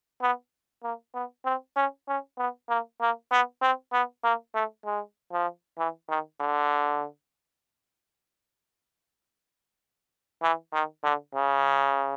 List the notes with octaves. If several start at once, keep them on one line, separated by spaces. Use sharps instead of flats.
B3
A#3
B3
C4
C#4
C#4
B3
A#3
A#3
B3
C4
B3
A#3
A3
G#3
F3
E3
D#3
D3
E3
D#3
D3
C#3